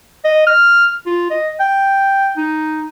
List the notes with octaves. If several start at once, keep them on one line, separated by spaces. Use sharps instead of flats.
D#5
F6
F4
D#5
G5
D#4